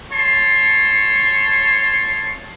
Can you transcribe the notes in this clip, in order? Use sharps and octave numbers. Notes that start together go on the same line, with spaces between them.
C#5 A5 C6